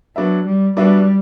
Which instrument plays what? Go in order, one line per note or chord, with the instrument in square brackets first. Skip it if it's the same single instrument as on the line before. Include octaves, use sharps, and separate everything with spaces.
[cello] F#3 [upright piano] B3 D4 F#4 B4 E5
[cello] G3
[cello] G3 [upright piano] B3 D4 F#4 B4 E5